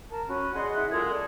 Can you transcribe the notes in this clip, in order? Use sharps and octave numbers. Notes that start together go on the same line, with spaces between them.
A#4 A5
C#4 F#4 B5
G#4 D5 D#5 F#5 C6
E4 E5
F#2 G#3 F4 A4 G#6
A4 D5